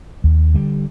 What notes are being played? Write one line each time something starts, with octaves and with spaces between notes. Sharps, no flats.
D#2
D3 G3